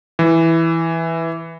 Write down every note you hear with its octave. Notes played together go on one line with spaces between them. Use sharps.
E3